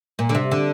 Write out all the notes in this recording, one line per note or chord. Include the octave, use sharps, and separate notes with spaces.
A#2
D3
C3
D3